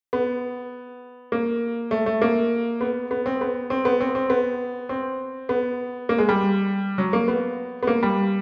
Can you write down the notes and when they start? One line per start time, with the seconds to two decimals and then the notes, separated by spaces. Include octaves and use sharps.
0.13 B3
1.32 A#3
1.91 A3
2.06 A3
2.22 A#3
2.81 B3
3.11 B3
3.26 C4
3.41 B3
3.70 C4
3.85 B3
4.00 C4
4.15 C4
4.30 B3
4.89 C4
5.49 B3
6.09 A#3
6.18 G#3
6.29 G3
6.98 F#3
7.13 A#3
7.28 B3
7.83 B3
7.87 A#3
8.03 G3